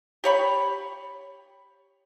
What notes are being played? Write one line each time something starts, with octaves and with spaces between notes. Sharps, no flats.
G4 C#5 B5